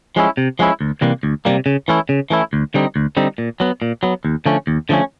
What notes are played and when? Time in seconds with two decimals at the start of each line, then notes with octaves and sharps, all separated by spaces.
0.16 F3 G#3 C#4 E4
0.37 C3
0.59 F3 G#3 C#4 E4
0.81 D2
1.01 C3 E3 G3 A#3
1.23 D2
1.45 C3 E3 G3 A#3
1.66 C#3
1.88 E3 A3 C#4 E4
2.09 C#3
2.30 E3 A3 C#4 E4
2.53 D2
2.74 D3 G3 C4 D#4
2.96 D2
3.17 D3 G3 C4 D#4
3.38 A#2
3.60 F#3 B3
3.82 A#2
4.03 F#3 B3
4.25 D#2
4.46 D3 F3 A3 C#4
4.67 D#2
4.89 D3 F3 A3 C#4